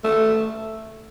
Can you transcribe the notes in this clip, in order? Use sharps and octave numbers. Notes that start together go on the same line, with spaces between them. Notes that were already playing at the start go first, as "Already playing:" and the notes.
A3